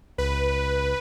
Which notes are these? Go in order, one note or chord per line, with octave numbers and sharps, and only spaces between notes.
C#2 B4